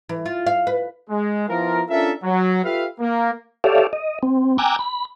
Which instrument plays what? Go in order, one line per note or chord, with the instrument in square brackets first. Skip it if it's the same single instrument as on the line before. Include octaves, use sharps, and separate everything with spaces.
[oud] E3
F4
F5
B4
[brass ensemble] G#3
F3 B3 E4 F4 A#4
C#4 D4 F4 A4 A#4 E5
F#3
F4 G4 A4 B4 E5 F5
A#3
[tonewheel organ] G4 A4 C#5 D5 E5 F5
D#5
C4
G5 G#5 A#5 D6 E6 F#6
B5